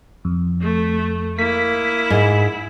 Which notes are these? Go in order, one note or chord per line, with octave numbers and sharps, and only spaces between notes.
F2
A3
A#3 E4 B6
G#2